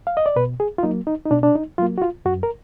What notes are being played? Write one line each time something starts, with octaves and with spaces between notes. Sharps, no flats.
F5
D#5
D5
B2 B4
G#4
F4
F#3 A#3 D#4
D#4
D#4
B2 D4
D4
D#4
F#3 A#3 F4
F#4
F4
F#2 F#4
A#4